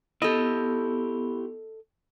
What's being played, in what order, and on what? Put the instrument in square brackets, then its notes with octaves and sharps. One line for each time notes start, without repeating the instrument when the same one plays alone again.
[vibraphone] B3 [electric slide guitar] E4 G4 [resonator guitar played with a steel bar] A4 D#5